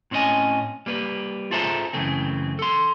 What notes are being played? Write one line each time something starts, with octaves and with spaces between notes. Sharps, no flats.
A2 C4 C#4 F#4 D#5 G#5
G3 A#3 B4
F4 G#4 A4 C5 E5 A#5
F#2 C#3 E3 A3 C4
A4 C6